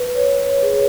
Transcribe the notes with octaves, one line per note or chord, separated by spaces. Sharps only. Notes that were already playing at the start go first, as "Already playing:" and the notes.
Already playing: B4
C#5
B4
G#4